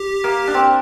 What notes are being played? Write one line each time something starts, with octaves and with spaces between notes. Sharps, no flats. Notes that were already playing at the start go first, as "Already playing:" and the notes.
Already playing: G4
A#3
D4
C4